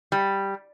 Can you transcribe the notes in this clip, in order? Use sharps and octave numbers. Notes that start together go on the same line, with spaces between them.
G3